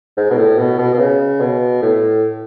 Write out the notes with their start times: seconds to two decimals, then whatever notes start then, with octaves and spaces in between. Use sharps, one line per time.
0.17 G#2
0.31 B2
0.37 A2
0.58 B2
0.79 B2
0.94 B2
0.99 C#3
1.40 B2
1.82 A2